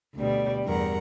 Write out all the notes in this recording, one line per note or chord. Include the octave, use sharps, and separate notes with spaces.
D2 B2 G3
E2 G2 A#4 F#5 A#5